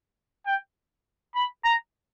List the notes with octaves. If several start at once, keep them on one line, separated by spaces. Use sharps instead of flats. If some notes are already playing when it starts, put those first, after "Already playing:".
G5
B5
A#5